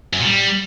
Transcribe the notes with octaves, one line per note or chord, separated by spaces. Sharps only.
F#2
A#2
G3